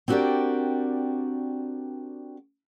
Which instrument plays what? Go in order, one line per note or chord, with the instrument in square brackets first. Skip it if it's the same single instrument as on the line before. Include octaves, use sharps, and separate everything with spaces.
[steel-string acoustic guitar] C4 D4 F#4 G4 A#4 D5